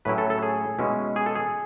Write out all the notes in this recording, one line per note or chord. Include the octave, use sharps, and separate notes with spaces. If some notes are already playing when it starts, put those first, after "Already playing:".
A2 F#3 C#4 E4 B4
A4
A4
G#4
B2 G#3 C#4 E4
G#4
A4
G#4